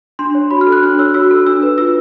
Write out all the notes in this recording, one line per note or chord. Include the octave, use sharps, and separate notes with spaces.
D4 C6
C#5
F#4 B5
F6
A4
F#6
D4 F#6
C#5 E6
F#4 E6
A4
D4 E6
B4
F4 E6